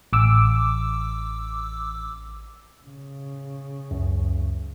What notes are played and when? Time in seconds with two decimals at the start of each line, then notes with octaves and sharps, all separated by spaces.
0.13 A1 D6 E6
2.85 C#3
3.91 C#2 F#2